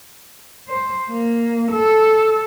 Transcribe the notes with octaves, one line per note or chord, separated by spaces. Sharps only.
C5
A#3
A4